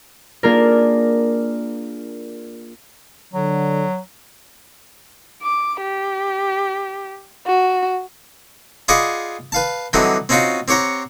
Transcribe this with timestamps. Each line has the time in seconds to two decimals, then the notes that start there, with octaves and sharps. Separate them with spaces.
0.43 A#3 D4 F4 G#4 A#4
3.33 D3 F#3
5.42 D6
5.81 G4
7.47 F#4
8.88 F4 G#4 D5 D#5 F#5 B5
9.52 B4 F5 A5
9.93 D3 E3 F#3 G3 C4 D#4
10.29 C4 C#4 D#4 F4 F#4 C5
10.68 C4 G4 C#5 F#5 A#5